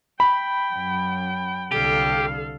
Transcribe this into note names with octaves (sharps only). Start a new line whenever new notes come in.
G5 B5
F#2
C2 D3 G4 A4 F5